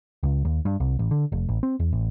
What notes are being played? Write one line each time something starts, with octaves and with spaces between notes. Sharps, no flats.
C#2
D#2
G2
C2
A1
D3
F1
A1
C4
E2
A1